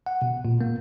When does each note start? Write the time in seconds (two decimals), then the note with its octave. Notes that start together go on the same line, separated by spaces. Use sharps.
0.06 F#5
0.22 B2
0.45 A#2
0.61 A#3